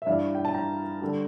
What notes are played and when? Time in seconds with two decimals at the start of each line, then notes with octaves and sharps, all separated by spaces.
0.02 E5
0.06 G2 E3 G3 D5 F5
0.35 G5
0.45 A5
0.54 G5 A#5
1.02 D3 G3